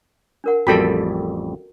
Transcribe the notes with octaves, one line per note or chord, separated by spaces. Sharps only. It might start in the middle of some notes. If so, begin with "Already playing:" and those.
D4 A#4 F#5
A1 F2 G3 F#4 A4 G5 B5